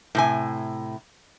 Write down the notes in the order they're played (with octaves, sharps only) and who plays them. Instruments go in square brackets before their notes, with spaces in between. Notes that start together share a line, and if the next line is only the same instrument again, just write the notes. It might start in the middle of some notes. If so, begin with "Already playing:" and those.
[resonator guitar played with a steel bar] A2 C3 G#5